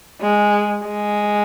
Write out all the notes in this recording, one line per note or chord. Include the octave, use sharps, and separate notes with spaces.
G#3
G#3